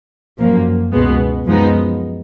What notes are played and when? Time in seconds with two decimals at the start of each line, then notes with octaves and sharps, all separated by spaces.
0.39 F#2 F3 A#3
0.92 C#2 B2 G#3 B3
1.45 F#2 F3 G#3 B3 D#4